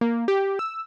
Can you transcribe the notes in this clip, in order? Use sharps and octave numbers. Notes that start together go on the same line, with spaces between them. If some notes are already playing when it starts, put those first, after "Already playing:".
A#3
G4
E6